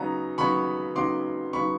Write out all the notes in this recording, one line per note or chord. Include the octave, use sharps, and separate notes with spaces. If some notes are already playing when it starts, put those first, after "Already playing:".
Already playing: C#3 F#3 B3 D#4 A#5
C#3 F#3 B3 D#4 B5 C#6
C#3 F#3 B3 D#4 C6 D6
C#3 F#3 B3 D#4 B5 C#6